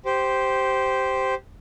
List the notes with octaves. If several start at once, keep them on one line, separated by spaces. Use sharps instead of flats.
G4 C5